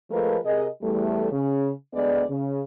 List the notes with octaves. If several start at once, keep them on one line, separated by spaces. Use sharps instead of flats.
F3 G#3 A3 F4 A#4 B4
C3 G#4 A#4 D#5
E2 E3 G3 A3
C#3
D2 G#3 B3 D5
C#3